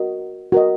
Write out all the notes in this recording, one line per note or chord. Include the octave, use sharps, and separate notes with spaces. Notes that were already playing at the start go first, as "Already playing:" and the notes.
Already playing: F#4 A#4 D#5
F#4 A#4 D#5